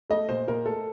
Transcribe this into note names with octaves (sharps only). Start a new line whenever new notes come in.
A3 D#5
A#2 C5
A#2 A#4
A3 A4